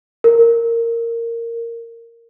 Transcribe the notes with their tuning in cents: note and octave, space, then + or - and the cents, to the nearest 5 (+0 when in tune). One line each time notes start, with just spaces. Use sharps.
A#4 -15